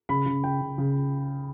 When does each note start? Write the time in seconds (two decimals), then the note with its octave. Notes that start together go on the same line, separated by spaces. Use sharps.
0.09 C#3 B5
0.26 C#3
0.44 C#3 G5
0.61 C#3
0.78 C#3